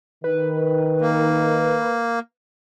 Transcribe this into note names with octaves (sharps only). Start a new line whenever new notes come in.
D#3 B4
A#3